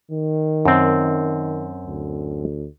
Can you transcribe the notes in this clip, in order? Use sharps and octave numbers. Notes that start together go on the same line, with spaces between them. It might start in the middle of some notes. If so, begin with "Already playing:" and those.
D#3
F#2 C4
D2